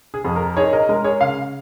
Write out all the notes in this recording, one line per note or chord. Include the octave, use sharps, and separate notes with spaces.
G#4
F2
A#4
D#4 G#4 C#5
A#4 D#5
G#3 A#4
G#4 C#5
C#3 F5